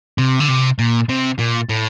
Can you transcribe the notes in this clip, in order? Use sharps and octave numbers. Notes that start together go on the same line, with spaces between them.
C3
D3
C3
A#2
C3
A#2
A2